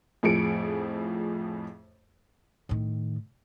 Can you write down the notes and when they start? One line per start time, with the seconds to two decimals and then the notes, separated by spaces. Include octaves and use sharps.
0.23 F2 A2 F3 G#4 C#7 D7
2.69 A2 D#3